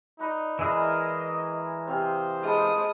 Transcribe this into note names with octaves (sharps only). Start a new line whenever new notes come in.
D#4 B4 D5 A#5
E3 G#3 E4 G#4 A#4 D#5
C3 C5 F5 G#5
G#3 F5 A5 B5 D#6